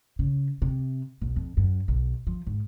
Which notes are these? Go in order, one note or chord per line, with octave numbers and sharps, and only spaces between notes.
C#3
C3
B1
F2
F#2
B1
F3
G#2